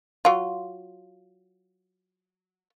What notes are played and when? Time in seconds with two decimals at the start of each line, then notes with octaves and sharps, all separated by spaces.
0.25 F#3 F4